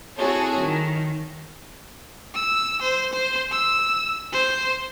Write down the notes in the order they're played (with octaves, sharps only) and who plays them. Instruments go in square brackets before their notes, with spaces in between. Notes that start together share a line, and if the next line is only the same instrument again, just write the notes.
[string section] C4 E4 F#4 G#4 A4 C#5
D#3
[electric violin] E6
C5
C5
E6
C5